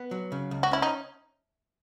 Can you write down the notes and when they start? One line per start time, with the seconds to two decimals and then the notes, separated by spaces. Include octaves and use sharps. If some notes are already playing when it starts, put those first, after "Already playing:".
Already playing: B3
0.11 F#3
0.32 C#3
0.51 C#2
0.63 F#4
0.71 C#4 E4
0.82 D#4